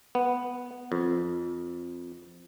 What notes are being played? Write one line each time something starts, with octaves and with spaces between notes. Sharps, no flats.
B3
F2